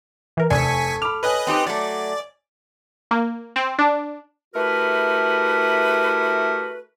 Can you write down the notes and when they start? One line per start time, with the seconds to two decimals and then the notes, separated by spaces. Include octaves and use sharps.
0.37 E3 A#4
0.50 F1 C3 D4 A4 G#5 C#6 B6
1.02 B5 D6 F6
1.23 B4 C#5 D#5 G#5 F#6
1.47 C4 D#4 G4
1.67 F#3 A3 D5
3.11 A#3
3.56 C4
3.78 D4
4.55 A3 E4 F#4 G4 A#4 B4